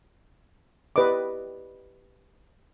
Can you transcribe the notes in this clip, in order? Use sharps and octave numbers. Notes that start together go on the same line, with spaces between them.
G4 B4 D5 D#5 D6